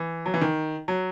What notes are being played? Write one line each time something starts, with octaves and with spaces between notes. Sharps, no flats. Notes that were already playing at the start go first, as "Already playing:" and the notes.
Already playing: E3
F#3
E3
D#3
F#3